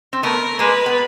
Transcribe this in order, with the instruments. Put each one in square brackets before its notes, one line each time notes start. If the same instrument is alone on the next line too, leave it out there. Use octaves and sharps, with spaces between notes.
[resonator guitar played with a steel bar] C4
[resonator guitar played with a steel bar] A3 B3 [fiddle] A#4
[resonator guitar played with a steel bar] G#3 A#3 [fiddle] B4
[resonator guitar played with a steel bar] B3